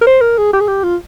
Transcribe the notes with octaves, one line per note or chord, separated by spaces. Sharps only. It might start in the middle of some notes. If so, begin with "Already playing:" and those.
A#4
C5
A#4
G#4
G4
G#4
G4
F4